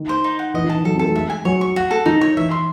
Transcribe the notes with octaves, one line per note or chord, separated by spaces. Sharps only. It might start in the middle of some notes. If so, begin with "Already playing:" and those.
Already playing: D#3
C5
D#4
F#5
E3 D#5
D#3
A5
E3
F#3 A4
C4 A4
A3
G#3 E5
G#5
F#3 C#5
C#6
F#4
A4
D#3 D#4
C#5
E3 E5
C6